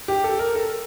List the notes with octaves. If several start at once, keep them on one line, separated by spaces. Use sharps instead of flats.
G4
A4
A#4
A4